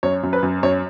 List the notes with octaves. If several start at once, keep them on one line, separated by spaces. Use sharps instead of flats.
F#2 C#5
F#2
B4
F#2
F#2 C#5